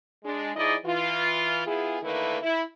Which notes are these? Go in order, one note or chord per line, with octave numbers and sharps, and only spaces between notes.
G#3 D4
F3 D#4 E4 G#4 D5 D#5
E3 F4
B3 E4 F4 G#4
D3 D#3 A3 A#3 E4 B4
E4